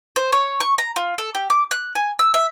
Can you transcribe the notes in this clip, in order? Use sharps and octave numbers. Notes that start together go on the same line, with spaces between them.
C5
C#5
C#6
A#5
F4
A4
G4
D6
F#6
G#5
E6
E5